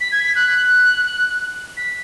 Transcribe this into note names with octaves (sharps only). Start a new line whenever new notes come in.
B6
G#6
B6
F#6
B6